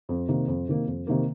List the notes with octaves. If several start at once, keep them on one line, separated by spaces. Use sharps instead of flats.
F2
C3 D#3 A#3
F2
C3 D#3 A#3
F2
C3 D#3 A#3